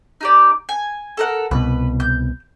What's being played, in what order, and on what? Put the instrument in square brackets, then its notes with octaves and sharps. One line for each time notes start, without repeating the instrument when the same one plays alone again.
[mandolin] D#4 G4 D5
G#5
A4 A#4 F#5
[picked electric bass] C2 B2 [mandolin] B4
[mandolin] G6